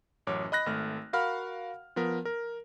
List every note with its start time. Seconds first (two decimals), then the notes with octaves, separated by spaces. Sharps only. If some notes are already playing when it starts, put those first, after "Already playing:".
0.27 A1 F#2 C#5 D6
0.52 D#5 B5 F#6 A#6
0.66 G#1 A3 F6
1.13 F#4 A#4 F5 F#5 B5 F6
1.96 F3 B3 A#4
2.25 A#4